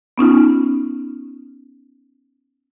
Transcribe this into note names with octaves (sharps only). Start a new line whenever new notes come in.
B3 C#4 D#4 F4